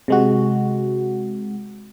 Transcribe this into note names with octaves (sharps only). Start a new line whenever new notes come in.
C3 G#3 F#4